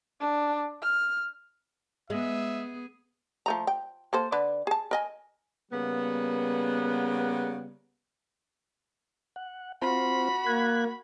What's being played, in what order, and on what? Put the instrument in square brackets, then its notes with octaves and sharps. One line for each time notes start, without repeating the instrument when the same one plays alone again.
[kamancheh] D4
F6
[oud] G#3 [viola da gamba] B3 G#4 [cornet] E5
[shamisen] F3 A3 A#5
G5
A#3 A4 C5
D3 B4 D5
G#4 A5
A#4 D#5 G#5
[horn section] C#3 G3 A#3 B3
[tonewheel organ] F#5
[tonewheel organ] C4 F4 C5 [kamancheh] F#4 B5
[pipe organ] A#3 [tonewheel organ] F#6 G#6